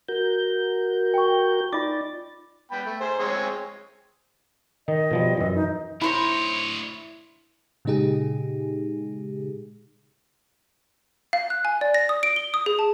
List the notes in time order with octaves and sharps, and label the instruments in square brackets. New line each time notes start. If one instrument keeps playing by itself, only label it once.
[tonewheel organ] F#4 A#4 G6
[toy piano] G5 C#6
[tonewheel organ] D#4 D5 A6 [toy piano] F4 D6
[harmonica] B3 G5 B5
A3
G#4 C5
G#3 C4 C#5
[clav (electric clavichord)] D#3 D#4 [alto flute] D#5
[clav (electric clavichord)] B2 F3 G3
F#2 E3
[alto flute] D#4
[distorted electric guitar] D2 C#5 [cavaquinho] D#4 C5 B5 [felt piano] E4
[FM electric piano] A#2 C#3 G#3 D#4 G4 G#4
[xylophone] F5
F#6
G#5
D5
A#6
D#6
D7
G7
D#6
G#4
A5